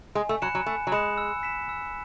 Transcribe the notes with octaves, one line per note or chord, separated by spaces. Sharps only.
G#3 G#5
A3
F#3 B5 F#6 C#7 E7
F#3
A3 G#5
F#3
G#3 B5 F#6 C#7 E7
E6
B6 E7
E6